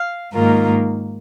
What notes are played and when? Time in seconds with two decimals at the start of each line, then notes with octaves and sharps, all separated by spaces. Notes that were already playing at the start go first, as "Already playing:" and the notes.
Already playing: F5
0.33 G#2 D#3 A#3 F4 A#4